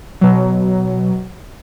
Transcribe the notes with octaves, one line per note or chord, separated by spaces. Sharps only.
B2 F#3